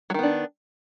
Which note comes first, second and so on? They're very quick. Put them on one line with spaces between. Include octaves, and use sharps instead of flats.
F#3 D#3 B3 D4